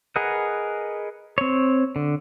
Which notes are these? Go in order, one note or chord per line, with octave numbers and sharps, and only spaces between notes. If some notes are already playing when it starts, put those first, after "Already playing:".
G#4 A#4 B4 D#5 F#5
C4 C#5
D3